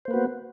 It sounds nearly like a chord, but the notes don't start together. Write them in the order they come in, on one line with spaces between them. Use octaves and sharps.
C5 A#3 B4 F#4 B3